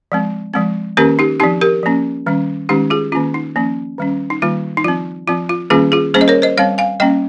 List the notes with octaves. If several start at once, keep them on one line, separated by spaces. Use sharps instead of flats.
F3 G#3 C4
F3 G#3 C4
D#3 A#3 C#4 G4 A#4
D#4 G4
F3 C4 D#4 G4
G4 A#4
F3 A#3 C#4
D#3 G3 C#4
D#3 G#3 C#4 D#4 G4
F4 G#4
D#3 A#3 C#4 F4
D#4
F3 A#3 C#4
D#3 G3 C#4
D#4
D#3 G3 A#3 F4
D#4
F3 C4 F4
F3 C4 F4
F4
D#3 G3 A#3 C#4 F4 G#4
F4 G#4
G3 A#3 C#4 G#4 C5
D#5
A#4 C#5
C5 D#5
G3 C4 C#5 F5
F5 G#5
G3 A#3 C#4 D#5 G5